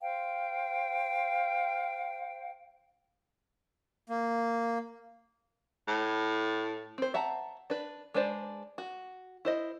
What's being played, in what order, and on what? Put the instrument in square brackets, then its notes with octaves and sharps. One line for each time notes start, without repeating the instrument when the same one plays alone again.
[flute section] C5 F5 G5
[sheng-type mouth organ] A#3
[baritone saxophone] A2
[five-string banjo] C4 C5
E5 F#5 A5 A#5
D4 B4
G#3 D4 B4 C5 D5
F#4
E4 C5 D#5